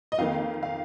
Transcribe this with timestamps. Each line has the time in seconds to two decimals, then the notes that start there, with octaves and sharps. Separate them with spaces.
0.12 D#5
0.18 F2 D#3 A#3 F5
0.63 F5